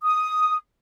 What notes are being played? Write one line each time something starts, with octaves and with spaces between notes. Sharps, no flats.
D#6